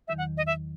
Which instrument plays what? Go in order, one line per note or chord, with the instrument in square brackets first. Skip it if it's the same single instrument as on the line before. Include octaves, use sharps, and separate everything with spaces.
[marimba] E2 D#3 F#3 [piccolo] E5
[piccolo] F#5
D#5
E5